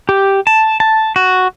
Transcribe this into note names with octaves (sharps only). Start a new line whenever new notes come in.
G4
A5
A5
F#4